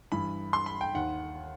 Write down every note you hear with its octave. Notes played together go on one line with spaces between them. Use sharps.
G2 E3 B5
C6
B5
G5
D#2 D#3 F#5